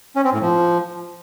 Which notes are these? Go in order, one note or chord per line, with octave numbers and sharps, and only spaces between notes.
C#4
C4
A2
F3